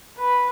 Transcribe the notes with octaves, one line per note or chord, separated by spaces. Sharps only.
B4